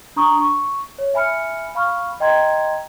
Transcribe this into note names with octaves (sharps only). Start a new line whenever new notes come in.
D4 A#5 C#6 D#6
C#6
C#5
E5 G#5 B5 F6 C#7
F5 B5 C#6 F6
D#5 G5 A#5 C6 G#6